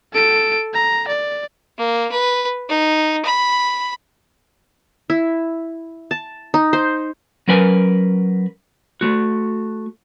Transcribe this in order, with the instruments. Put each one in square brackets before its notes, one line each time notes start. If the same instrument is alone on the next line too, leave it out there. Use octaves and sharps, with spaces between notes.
[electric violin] A4 D7
A#5
D5
[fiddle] A#3
B4
D#4
B5
[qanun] E4
A5
D#4
C5
[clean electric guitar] F#3 C#4 A#4 B4 G#5
A3 F#4